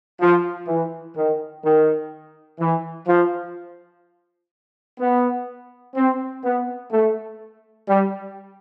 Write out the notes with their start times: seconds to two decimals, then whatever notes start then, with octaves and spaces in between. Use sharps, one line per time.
0.20 F3
0.67 E3
1.16 D#3
1.64 D#3
2.60 E3
3.08 F3
5.00 B3
5.95 C4
6.44 B3
6.92 A3
7.88 G3